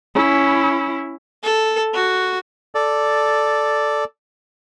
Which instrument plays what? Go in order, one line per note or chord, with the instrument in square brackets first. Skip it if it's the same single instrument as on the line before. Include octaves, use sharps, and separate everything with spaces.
[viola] C#4 E4
[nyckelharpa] A4
F#4
[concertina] A4 D5